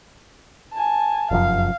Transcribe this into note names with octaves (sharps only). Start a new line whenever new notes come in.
G#5 A5
F1 F#2 F3 F5